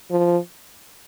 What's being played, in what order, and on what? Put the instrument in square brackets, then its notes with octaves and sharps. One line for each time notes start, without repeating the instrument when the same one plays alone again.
[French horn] F3